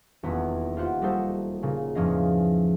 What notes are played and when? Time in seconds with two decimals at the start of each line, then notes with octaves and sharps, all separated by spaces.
0.23 D#1 E2 B3
0.77 F4 G4 C5 F#5
1.02 G3 A#3 D#4 F#4 A4 C5
1.63 A#2 C#3
1.95 E2 G#2 F3 C#4 D#5 F5